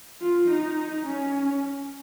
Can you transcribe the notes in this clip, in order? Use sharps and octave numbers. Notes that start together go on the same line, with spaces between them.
F4
D#4
C#4